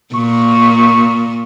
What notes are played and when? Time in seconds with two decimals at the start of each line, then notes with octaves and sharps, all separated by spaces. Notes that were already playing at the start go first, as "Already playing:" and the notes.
0.15 A#2 C#6